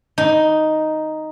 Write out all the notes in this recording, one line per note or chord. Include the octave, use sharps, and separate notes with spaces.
D#4